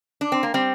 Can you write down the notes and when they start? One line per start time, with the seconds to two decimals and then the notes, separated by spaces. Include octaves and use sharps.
0.21 D4
0.32 C4
0.43 A#3
0.54 G3 C4